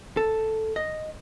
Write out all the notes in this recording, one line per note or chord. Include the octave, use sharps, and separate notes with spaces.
A4
D#5